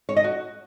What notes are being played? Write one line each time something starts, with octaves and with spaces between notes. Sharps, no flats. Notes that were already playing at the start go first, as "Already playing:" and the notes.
C#5
D#5
F#4